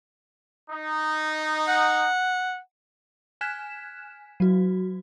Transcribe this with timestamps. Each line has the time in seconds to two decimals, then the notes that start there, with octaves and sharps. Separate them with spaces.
0.70 D#4
1.68 F#5
3.41 G#5 F6 F#6 G#6 B6 E7
4.40 F#3 F#4